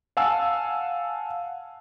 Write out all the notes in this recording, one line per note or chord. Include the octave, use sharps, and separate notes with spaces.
F5 F#5 G#5 A5 E6